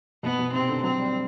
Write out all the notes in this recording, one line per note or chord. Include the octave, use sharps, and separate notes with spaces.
B2 B3
B2
C3 C4
D3
F#3 C4
G3